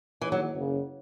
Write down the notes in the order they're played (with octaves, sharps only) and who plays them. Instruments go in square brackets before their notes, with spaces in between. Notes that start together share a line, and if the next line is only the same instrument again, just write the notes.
[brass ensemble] D#3 A#3 D#4 G#4 C#5 [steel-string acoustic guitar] E3
[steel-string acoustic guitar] F#3
[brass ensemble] F#1 F#2 C#3